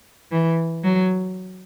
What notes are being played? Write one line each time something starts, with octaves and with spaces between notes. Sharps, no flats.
E3
F#3